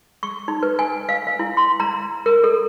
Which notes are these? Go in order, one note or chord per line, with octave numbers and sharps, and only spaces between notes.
C#6
D#4
B4
G#5
F5
F5
E4
C6
A#5
A#4
A4